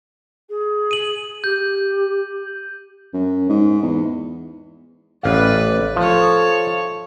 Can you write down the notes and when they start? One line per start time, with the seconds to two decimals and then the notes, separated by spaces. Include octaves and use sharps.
0.49 G#4
0.91 D#7 F#7
1.44 G4 G6
3.14 F#2
3.50 G#2
3.83 E2
5.23 A1 B4 D5 F5
5.96 F3 A4 C#5